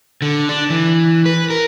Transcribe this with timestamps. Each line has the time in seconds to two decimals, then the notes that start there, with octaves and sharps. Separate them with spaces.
0.22 D3
0.49 D4
0.70 E3
1.26 B4
1.50 A#4